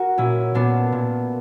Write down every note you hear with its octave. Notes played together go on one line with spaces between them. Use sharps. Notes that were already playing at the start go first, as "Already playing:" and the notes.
Already playing: F#4 A#4
A#2 C#4 E4
A#2 B3 D4
A#2